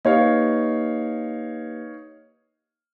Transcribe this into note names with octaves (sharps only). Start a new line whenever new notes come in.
A#3 D#4 G4 B4 C#5 F5